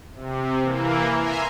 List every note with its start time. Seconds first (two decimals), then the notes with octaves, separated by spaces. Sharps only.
0.15 C3
0.62 E3 A#3
1.16 E5 G#5 A#5 C6